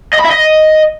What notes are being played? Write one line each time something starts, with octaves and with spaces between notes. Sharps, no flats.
D#5
B5
E5
D#5